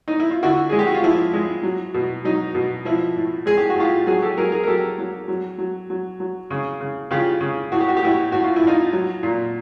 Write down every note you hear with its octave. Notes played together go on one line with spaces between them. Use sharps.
D#4
E4
F4
D3 E4 F#4
G#3 G#4
G4
F#4
F4
F3 E4
G#3
F#3
B2
F#3 D#4
B2
F3 E4
A2
G#3 G#4
G4
F#4
A2 F4 G4
F#3 F#4 G#4
G4 A4
F#3 G#4 A#4
G#4 A#4
A#4
F#3 G4 A4
F#3
F#3
F#3
F#3
F#3
C#3
C#3
C#3 F4 G4
C#3
A2 F#4
G4
F#4
G4
A2 E4 F#4
A2 F#4
F4
E4
A2 D#4 F4
F#3
A#2